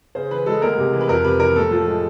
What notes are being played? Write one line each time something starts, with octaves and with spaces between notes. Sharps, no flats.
C#3 C5
E3 B4
G#3 A4
D2 A#4
C3
E3
B4
F2 A#4
C3 B4
E3 A#4
A2 A4
F3
G#3